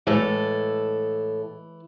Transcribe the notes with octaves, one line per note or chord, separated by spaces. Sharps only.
A2 E3 G#3 A4